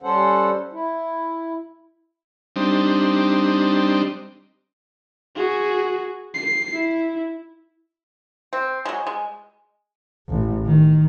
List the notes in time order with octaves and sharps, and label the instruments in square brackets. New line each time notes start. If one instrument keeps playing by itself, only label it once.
[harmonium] G3 C#4 A4 C5 F#5
E4
[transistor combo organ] G3 C4 D4 D#4
[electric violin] F#4 G#4
C7
E4
[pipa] C4
F#3 G#3
G#3
[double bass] A1
D#3